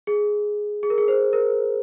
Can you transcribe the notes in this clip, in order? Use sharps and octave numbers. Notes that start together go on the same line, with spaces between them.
G#4
G#4
A#4
G#4
C5
A#4